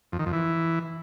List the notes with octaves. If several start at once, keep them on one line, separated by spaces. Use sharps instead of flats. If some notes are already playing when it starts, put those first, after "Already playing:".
F2
D#3
F2
E3